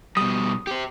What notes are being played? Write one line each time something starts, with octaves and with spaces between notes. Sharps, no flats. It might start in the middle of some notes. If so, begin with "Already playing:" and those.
B2 G3 D#6
G4 C5